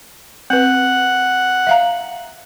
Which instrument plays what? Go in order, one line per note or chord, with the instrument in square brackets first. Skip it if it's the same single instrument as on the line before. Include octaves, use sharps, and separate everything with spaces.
[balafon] C4 B4 [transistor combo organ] F#5
[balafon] E5 F5 A#5